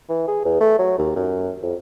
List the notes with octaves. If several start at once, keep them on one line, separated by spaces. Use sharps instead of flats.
E3
G#4
E2
A3
F#3
D#2
F#2
F2